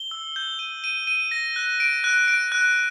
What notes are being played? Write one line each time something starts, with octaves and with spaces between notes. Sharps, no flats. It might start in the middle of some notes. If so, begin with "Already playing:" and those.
Already playing: G7
E6
G6
D#7
D#7
D#7
A#6
F#6
D7
F#6
D7
F#6